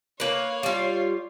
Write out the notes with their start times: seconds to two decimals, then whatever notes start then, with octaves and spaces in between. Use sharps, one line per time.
0.20 A#3 B4 C#5 F5
0.63 G3 F4